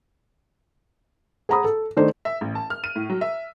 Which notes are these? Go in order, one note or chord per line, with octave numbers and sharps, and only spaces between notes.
G#4 F#5 A#5 B5 D#6
A4
D#3 A3 D4 D#4 C5 D5
E5
A1
A5
F6
D#7
A2
F#3
E5